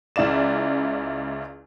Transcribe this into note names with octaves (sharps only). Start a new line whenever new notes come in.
C#2 C#3 E4 D5 E7